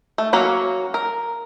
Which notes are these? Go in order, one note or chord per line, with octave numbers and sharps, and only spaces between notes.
A3
F#3 A#3 C#4 F#4
A#4